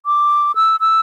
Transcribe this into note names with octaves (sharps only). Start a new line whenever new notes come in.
D6
E6
E6